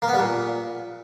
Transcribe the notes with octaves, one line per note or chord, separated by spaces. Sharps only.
A#3
B3
G3
A#2